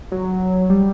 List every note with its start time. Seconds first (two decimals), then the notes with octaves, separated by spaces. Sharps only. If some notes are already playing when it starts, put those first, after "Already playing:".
0.12 F#3
0.70 G3